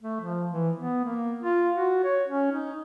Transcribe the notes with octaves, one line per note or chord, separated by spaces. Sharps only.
A3
F3
E3
B3
A#3
F4
F#4
C#5
C#4
D#4